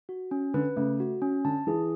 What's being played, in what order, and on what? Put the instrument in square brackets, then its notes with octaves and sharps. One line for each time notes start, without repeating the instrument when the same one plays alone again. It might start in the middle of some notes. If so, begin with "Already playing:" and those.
[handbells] F#4
C#4
[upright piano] D3 [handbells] B4
[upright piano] C#3 [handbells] A3
[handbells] F#4
C#4
[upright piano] D3 [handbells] A5
[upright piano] E3 [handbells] G#4